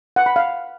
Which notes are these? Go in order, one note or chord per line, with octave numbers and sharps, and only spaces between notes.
F#5
B5
F5